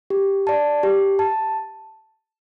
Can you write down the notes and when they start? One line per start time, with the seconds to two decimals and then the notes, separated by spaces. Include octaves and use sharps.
0.10 G4
0.47 D5 A5
0.83 G4
1.19 A5